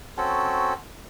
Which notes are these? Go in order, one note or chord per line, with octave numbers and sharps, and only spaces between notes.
C4 C#4 F#4 A4